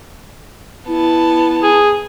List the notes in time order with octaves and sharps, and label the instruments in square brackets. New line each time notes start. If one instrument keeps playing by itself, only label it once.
[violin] B3 A5 [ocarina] E4
[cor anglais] G#4